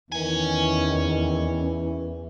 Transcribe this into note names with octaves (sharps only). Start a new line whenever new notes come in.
E2 D#3 E3 C#4 G#5